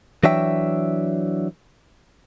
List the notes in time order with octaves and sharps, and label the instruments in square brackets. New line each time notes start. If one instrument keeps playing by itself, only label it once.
[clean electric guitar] E3 F#3 D4 C#5 E5 G5